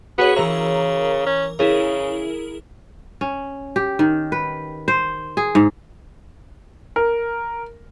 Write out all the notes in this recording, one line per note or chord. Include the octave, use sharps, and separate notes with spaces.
B3 F#4 G#4 C#5
C#3 E3 A#4 A#5
C#4
C#3 E4 G#4 A#4
C#4
G4
D#3
B4
C5
G#4
G#2
A#4